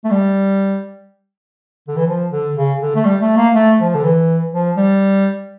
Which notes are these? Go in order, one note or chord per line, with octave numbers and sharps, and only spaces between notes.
A3
G3
D3
E3
F3
D3
C#3
D3
A3
G3
A3
A#3
A3
F3
D3
E3
F3
G3